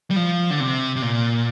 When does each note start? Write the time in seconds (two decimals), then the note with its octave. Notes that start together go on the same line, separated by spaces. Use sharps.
0.10 G3
0.16 F3
0.51 D3
0.60 C3
0.96 C3
1.02 A#2